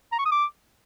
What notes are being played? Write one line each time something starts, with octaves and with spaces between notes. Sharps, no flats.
A#5
C#6
D#6
D6